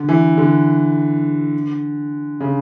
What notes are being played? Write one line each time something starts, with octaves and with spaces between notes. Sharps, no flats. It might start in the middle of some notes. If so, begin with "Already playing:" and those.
Already playing: D3
E3
D3
C#3